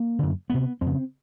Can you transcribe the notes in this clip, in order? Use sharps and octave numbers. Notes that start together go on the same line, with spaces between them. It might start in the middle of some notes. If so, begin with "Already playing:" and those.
Already playing: A#3
F#2 D3
D2 C3 B3
F2 C4
C#3